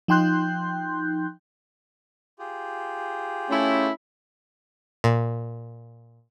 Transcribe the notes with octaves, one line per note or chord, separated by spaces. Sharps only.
F3 D#4 G5 C6 F#6 G6
F4 G4 G#4
A3 C#4 E4
A#2